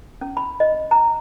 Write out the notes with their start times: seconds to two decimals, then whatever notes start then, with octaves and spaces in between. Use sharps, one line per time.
0.21 C#4
0.37 B5
0.60 D#5
0.91 A#5